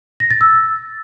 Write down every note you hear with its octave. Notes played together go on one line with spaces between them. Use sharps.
A#6
A6
E6